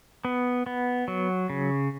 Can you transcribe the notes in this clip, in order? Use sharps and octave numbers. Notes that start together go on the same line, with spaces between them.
B3
B3
F#3
C#3